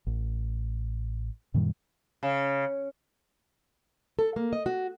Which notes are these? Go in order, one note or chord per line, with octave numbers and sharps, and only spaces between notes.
A1
F#2 A#2 D#3 G3
C#3
A4
A#3
D#5
F#4